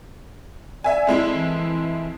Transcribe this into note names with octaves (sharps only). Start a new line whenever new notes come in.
D5 E5 G#5
F2 G#3 E4
E3